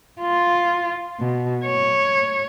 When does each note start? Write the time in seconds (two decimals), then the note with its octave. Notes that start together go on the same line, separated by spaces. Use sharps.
0.21 F4
1.20 B2
1.66 C#5